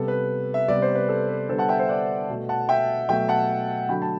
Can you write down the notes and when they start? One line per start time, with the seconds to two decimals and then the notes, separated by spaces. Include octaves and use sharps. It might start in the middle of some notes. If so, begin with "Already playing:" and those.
Already playing: C3 G3 B3 A4
0.08 B4
0.54 E5
0.68 C3 G3 B3 D5
0.82 C5
0.95 B4
1.09 A4
1.29 B4
1.49 D3 G3 B3 A4 C5
1.58 F#5 A5
1.68 E5 G5
1.79 C5 E5
1.89 D5 F#5
2.29 B2 A3
2.49 F#5 A5
2.69 E5 G5
3.09 B2 F#3 A3 E5 G5
3.29 F#5 A5
3.89 D3 F#3 A3 G5 B5
4.02 A5